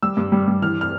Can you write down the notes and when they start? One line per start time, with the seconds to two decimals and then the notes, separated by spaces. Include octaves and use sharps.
0.03 G3 E6
0.17 G2
0.32 G3
0.48 G2
0.62 E3 F6
0.81 F6